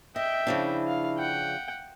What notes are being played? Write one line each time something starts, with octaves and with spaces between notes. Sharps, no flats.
D#5 E5 G5
C#3 F3 D4 E4
F5
F#5 G5